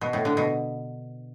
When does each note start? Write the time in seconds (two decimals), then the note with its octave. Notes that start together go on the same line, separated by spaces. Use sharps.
0.01 B2
0.13 A2
0.25 D3
0.37 B2